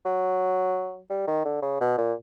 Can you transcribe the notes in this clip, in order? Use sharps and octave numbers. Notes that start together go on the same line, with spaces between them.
F#3
G3
D#3
D3
C#3
B2
A#2